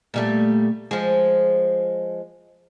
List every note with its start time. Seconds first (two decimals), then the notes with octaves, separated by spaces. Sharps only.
0.14 A#2 G3 A3
0.91 F3 G#3